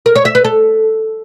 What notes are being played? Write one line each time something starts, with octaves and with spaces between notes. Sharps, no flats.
A#4
C#5
E5
B4
A4